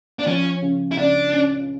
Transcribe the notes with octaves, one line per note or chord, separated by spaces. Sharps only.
D4
F3 C#4
C#3
E4
C#2 D4
C#4